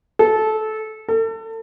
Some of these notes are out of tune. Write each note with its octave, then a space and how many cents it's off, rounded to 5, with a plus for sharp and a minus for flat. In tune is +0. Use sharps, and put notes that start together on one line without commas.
A4 -20
A4 +35